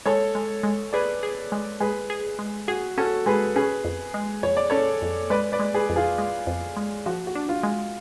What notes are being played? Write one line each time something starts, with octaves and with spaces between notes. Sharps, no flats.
G#3 A4 C#5
G#3
G#3
G#4 B4 D5
G#4
G#3
G#3 G#4 B4
G#4
G#3
F#4 G#4
C#4 F#4 A4
G#3 G#4 B4
C#4 G#4 B4
F2
G#3
F2 C#5
D5
C#4 A4 C#5
F2
G#3 B4 D5
B4 D5
G#3
G#4 B4
F2
F4 G#4
G#3
F2
G#3
F3 F#4
F#4
D4
F4
G#3